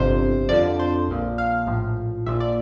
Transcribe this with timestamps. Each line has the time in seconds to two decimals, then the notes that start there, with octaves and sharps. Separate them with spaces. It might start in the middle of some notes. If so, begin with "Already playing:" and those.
Already playing: G1 F2 C3 C5
0.49 F2 D3 F3 D5
0.79 C5
1.08 A#1 A#2 F3
1.38 F5
1.67 A#1 A2 F3
2.26 A#1 A#2 F3 E5
2.40 D5